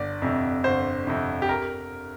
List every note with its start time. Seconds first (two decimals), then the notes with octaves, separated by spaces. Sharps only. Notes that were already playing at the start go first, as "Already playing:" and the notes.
Already playing: G1 D5
0.22 F2 C3
0.64 G1 C5
1.07 F2 C3
1.42 G4
1.49 A#4